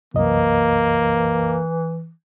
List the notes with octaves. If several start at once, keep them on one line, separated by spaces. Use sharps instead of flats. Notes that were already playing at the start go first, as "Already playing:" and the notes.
C2 F#2 E3 A#3 D#5